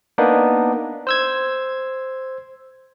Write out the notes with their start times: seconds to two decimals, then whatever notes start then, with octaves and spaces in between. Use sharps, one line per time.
0.18 A#3 B3 D4 D#4
1.07 C5 E6 G#6